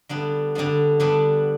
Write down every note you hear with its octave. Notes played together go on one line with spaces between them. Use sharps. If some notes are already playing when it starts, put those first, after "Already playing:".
D3 G3 B3 D4
D3 G3 B3 D4
D3 G3 B3 D4